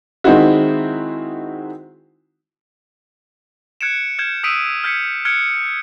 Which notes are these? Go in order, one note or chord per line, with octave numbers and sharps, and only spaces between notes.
D#3 G#3 C4 D#4 E4 F#4
F#6 G#6 C#7 D7 E7
F6 G6 G#6 E7
D#6 E6 B6 D7 D#7
F6 G6 G#6 B6 C#7
F6 F#6 G#6 C#7 D7